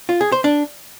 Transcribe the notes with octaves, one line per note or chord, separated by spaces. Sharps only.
F4
G#4
C5
D4